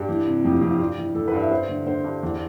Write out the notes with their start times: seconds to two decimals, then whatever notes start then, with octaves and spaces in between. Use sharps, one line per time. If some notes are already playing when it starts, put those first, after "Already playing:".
Already playing: G2 G4
0.09 E3
0.27 C3
0.44 F2 G4
0.52 F4
0.61 F2 G4
0.71 F4
0.79 G2 G4
0.98 E3
1.15 E3 A4
1.28 B4
1.33 G2 F5
1.40 E5
1.51 G2 C5
1.69 D3
1.86 D3 C5
2.04 G2
2.23 E2